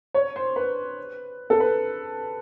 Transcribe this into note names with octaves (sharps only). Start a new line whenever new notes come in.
C#5
C5
B4
A4
B4